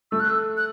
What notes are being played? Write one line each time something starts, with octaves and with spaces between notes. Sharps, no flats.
A3 E6
F#6
E6
F#6